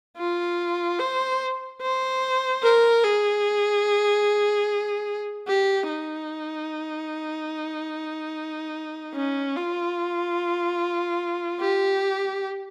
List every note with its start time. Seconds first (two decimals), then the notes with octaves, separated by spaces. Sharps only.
0.18 F4
0.99 C5
1.82 C5
2.62 A#4
3.04 G#4
5.48 G4
5.89 D#4
9.15 C#4
9.56 F4
11.60 G4